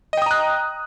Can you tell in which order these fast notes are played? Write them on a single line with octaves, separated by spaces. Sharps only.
D#5 G5 D#6 A#5 F#6